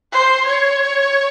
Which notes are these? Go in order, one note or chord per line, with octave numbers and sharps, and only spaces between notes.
C5
C#5